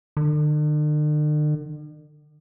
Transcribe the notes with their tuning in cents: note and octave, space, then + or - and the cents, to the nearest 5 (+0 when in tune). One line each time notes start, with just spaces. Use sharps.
D3 +45